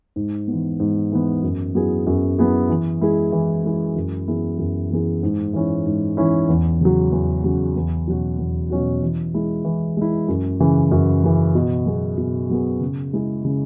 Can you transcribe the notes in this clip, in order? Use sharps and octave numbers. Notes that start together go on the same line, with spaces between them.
G#2
B3
E3
G#2
E3 B3
F#2
F#3 B3 E4 G#4
F#2
F#3 B3 E4 G#4
E3
G#3 E4 G#4
E3
G#3 E4 G#4
F#2
E3 B3 E4 G#4
F#2
E3 B3 E4 G#4
G#2
E3 C#4 E4
G#2
E3 C#4 E4
E2
C#3 F#3
E2
C#3 F#3
E2
B2 F#3 C#4 F#4
E2
B2 F#3 C#4 F#4
E3
G#3 E4
E3
G#3 E4
F#2
C#3 E3
F#2
C#3 E3
B2
F#3 B3 G#4
B2
F#3 B3 G#4
C#3
G#3 E4 G#4
C#3